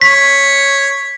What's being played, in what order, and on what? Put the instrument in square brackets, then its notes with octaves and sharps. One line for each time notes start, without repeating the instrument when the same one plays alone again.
[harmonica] C#5 [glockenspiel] B6